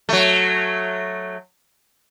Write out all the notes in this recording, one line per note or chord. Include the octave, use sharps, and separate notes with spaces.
F#3 A3